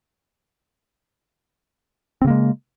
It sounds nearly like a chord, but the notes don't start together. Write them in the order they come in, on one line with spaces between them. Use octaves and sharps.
C4 C#3 A#3 G#3